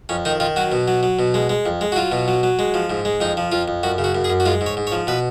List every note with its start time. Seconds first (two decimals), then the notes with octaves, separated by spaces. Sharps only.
0.09 F2 C#4
0.25 D#3 D#4
0.40 D#3 F4
0.56 F#3 F#4
0.72 B2
0.88 F#3
1.03 F#3
1.19 B2
1.34 G#3
1.49 G#3
1.66 F2
1.81 G#3
1.92 F#4
1.96 F#3 F4
2.12 B2
2.28 F#3
2.43 F#3
2.59 G#3
2.74 F3
2.90 G#2
3.05 G#3
3.21 F2 D#4
3.37 F3
3.52 F2 F4
3.68 F2
3.83 F#2 F#4
3.98 C#3
4.04 F#4
4.15 F#2
4.24 G#4
4.30 F#2
4.40 F#4
4.45 G#3 F4
4.61 G#2
4.66 C#5
4.77 G#2
4.87 C#5
4.92 F3
5.07 B2 B4